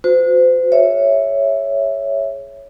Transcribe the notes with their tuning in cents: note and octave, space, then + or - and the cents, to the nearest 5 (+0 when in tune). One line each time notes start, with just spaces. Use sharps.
F#4 -35 C5 -35
G#4 +10 C#5 +0 E5 +0